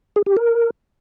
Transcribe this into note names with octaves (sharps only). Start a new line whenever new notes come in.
G#4
G4
A#4